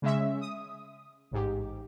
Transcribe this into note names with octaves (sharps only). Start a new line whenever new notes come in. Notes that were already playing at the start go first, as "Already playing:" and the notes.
C#3 G#3 C#4 E5
D#6
A1 G#2 G4